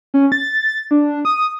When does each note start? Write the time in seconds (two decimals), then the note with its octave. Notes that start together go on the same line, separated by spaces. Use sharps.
0.14 C#4
0.32 A6
0.91 D4
1.25 D#6